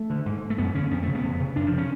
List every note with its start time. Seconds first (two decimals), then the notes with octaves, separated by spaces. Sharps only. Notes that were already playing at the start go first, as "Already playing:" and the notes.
Already playing: A3
0.10 D3
0.26 G#2
0.50 A3
0.58 F#2 B3
0.75 D3 C#4
0.91 F2 B3
1.03 C#3 A3
1.15 B3
1.24 F2
1.40 C#3
1.56 F#2 D4
1.67 F3
1.72 C#3
1.78 C#4